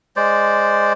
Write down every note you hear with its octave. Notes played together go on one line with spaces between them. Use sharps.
G#3 C5 D5